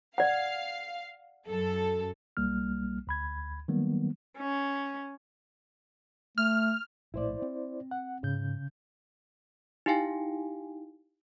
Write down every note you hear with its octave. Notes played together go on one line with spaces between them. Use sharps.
D5 F5 F#5
F#2 A4
B1 G3 A#3 F6
D2 B5 G#6
D#3 F#3 G3 A#3 B3
C#4
A3 F6
A#1 A2 E4 C5 D5
C4
F#5
G#2 C#3 G6
D#4 E4 G4 F5 G5 G#5